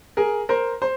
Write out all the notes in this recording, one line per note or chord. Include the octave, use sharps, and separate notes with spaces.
G#4 A#4
A#4 C5
C5